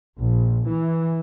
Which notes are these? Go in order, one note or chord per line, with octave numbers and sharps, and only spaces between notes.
A#1
E3